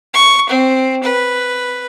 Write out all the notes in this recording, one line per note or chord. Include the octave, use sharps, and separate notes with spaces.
C#6
C4
B4